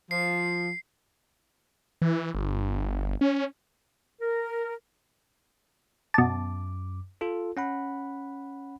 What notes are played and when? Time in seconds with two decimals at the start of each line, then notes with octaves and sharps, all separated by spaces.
0.11 F3 C7
2.02 E3
2.34 G1
3.21 C#4
4.20 A#4
6.14 F#2 B2 A5 D6
7.21 F4 A4
7.57 C#4 F#5 B5